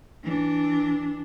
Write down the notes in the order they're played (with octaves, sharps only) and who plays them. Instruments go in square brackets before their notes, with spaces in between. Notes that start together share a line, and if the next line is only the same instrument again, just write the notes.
[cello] E3 D4